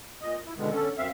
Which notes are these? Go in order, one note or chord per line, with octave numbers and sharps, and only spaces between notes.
A#2 D#5
E4
B2 D3 D#3 G#3 B3
D3 C#4 A4
F#2 C4 E5 F5